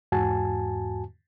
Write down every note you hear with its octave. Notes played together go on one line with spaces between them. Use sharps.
E2 G#2 F#4 G#5 A5